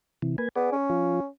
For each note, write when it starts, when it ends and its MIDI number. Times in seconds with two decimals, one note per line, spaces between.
0.22 0.36 48
0.22 0.36 52
0.38 0.49 58
0.38 0.49 71
0.38 0.49 80
0.56 0.71 59
0.56 0.76 68
0.56 0.76 74
0.73 1.27 61
0.90 1.20 53
0.90 1.20 65